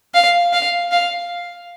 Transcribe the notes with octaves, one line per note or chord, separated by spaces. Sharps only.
F5
F5
F5